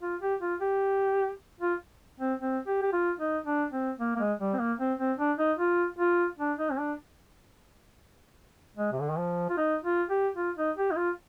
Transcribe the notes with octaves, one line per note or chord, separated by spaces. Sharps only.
F4
G4
F4
G4
F4
C4
C4
G4
G4
F4
D#4
D4
C4
A#3
A#3
G#3
G3
C4
A#3
C4
C4
D4
D#4
F4
F4
D4
D#4
C4
D4
G#3
C3
D3
D#3
F3
F4
D#4
F4
G4
F4
D#4
G4
D#4
F4